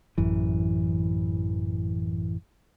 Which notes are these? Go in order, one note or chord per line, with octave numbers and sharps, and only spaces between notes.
A1 F#2 E3